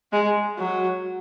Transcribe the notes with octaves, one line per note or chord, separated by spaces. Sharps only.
G#3
F#3